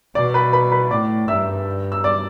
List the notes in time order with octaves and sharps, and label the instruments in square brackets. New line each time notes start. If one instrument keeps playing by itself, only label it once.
[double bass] B2 [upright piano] D5 D6
[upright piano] B4 B5
B4 B5
B4 B5
[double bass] A2 [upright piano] D5 D6
[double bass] G2 [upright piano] E5 E6
[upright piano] E6
D5 D6